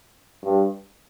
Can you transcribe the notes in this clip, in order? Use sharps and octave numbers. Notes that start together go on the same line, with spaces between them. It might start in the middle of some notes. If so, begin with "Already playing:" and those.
G2